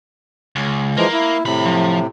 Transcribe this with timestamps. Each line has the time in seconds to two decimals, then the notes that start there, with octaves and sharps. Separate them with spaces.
0.56 C#2
0.97 E3 F3 G#3 A#3
1.13 E4
1.45 D#2 A2 C3 B5
1.65 F3